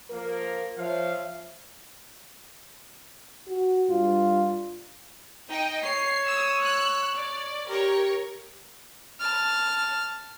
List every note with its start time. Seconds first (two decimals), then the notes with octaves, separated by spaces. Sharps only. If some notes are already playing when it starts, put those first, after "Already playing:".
0.10 F3 A#3 A#4
0.77 F3 C#5 E5 F5
3.48 F#4
3.90 G2 F4
5.48 D#4 D#5 G5
5.83 C#5 C7
6.27 D#6 E6
6.63 E6 F#6
7.15 D5
7.67 G4 A#4 C#5
9.20 A5 F6